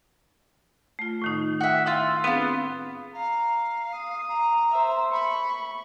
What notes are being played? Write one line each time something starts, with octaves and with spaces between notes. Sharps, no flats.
A3 F4
A2 D#3 D#4
F#4 E5
E4 F4 E6
B3 C4 D4 F4 G#4
F5 A#5
D#6
A#5
C5 E5
B5 C#6